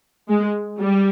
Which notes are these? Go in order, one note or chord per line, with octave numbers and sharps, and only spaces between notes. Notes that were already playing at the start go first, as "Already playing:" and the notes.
G#3
G3